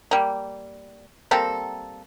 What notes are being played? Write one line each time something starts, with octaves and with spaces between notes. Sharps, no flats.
G3 A#3
G3 A#3 C4 A4